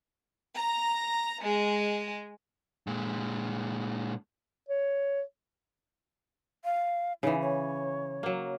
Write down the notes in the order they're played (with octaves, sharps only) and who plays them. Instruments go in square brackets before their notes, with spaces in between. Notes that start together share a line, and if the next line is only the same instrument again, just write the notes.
[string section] A#5
G#3
[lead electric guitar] A#2 G#3
[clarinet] C#5
[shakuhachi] F5
[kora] C#3 E3 [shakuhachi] D#4
[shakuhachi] C#5
[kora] F#3 A#3